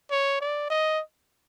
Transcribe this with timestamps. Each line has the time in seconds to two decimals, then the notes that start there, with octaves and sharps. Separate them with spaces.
0.11 C#5
0.41 D5
0.70 D#5